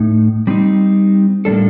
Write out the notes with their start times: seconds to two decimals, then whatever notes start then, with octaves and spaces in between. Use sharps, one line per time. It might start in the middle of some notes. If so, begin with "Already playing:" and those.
Already playing: A2 A3 D#4
0.47 G3 C4 D#4
1.45 A2 G3 A#3 D4 A4